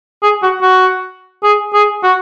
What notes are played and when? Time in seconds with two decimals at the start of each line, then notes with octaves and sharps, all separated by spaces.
0.23 G#4
0.43 F#4
0.62 F#4
1.43 G#4
1.74 G#4
2.04 F#4